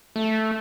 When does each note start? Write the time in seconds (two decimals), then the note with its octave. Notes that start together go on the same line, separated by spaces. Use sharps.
0.16 A3